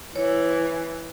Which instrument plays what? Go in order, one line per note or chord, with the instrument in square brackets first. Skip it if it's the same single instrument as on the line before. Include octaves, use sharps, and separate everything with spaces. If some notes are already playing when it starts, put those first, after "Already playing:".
[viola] E3 [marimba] C#5